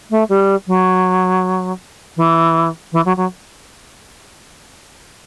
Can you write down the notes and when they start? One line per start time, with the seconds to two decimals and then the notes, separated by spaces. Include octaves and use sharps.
0.10 A3
0.29 G3
0.67 F#3
2.17 E3
2.92 E3
3.05 F#3
3.17 F#3